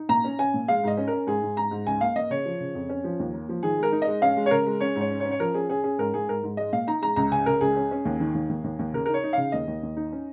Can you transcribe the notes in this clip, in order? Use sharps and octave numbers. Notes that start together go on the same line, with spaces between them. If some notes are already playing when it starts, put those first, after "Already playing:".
Already playing: D#4
A#2 A#5
C#4
C#4 G#5
A#2
G#3 F5
G#2 D#5
C#4
C#4 A#4
G#2 G#4
G#2
G#2 A#5
G#2
C#2 G#5
A#3 F5
A#3 D#5
C#3 C#5
F3
C#3
F2
C#4
F3
D#2
A#3
F3
D#3 G#4
G#3 A#4
D#4
D#5
G#3
C#4 F5
G#3
C#5
C#3 A#4
G#3
C#4 C#5
G#2
C#5
C#4
C#5
C#4
C#5
F3 A#4
C#4 G#4
C#4 G#4
C#4 G#4
G#2 A#4
G#2 G#4
G#2 A#4
G#2
G#3 D#5
A#2 F5
D#4 A#5
G#3 A#5
C#2 A#5
C#3 G#5
C#3 A#4
C#2 G#4
C#4
C#4
D#2
D#3
D#2
D#2
D#2
D#2
C#3 A#4
A#4
D#4
C#5
D#4
C#3 F5
D#2 D#5
D#2
D#2
D#4
C#4